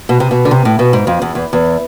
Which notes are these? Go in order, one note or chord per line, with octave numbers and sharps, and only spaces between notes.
B2
C3
B2
D3
C3
A2
B2
G#2
F2
E2
E2
E2